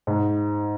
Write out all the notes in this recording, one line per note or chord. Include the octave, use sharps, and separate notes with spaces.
G#2